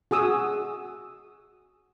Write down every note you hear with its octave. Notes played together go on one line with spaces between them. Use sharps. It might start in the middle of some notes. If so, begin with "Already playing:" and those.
F#4 G#4 D#6 E6